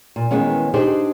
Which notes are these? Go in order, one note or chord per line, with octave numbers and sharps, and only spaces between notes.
A#2
D#3 E3 G#3 B3 C#4
D4 D#4 G4 G#4 C5